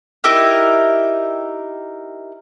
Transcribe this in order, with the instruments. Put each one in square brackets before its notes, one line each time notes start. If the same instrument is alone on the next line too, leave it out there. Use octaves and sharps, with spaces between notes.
[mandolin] D#4 E4 G4 A#4